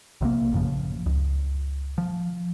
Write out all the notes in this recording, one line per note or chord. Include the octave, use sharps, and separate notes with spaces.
B1 C3 E3 A#3
A1 F#2 C#3 F3
C#2
F3